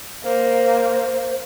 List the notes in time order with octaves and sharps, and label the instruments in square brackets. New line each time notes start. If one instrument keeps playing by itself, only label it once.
[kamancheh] A#3 [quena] C5